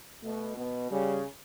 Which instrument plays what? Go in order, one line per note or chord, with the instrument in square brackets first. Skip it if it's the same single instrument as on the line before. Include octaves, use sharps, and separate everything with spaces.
[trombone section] B2 [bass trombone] A3
[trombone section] B2 [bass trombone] B3
[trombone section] C#3 [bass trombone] G3